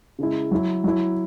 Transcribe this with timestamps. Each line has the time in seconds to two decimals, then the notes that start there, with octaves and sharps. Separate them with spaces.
0.19 C#3 G#3 E4
0.51 F#3 E4
0.84 F#3 E4